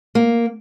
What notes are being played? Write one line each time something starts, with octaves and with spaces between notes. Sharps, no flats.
A#3